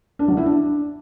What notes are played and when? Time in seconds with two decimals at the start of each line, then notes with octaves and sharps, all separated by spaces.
0.19 D4
0.28 F#3
0.37 E4
0.46 D4